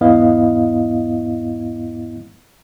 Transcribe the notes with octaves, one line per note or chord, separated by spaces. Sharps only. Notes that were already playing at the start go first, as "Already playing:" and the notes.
E2 G#2 B3 E4 D#5 F5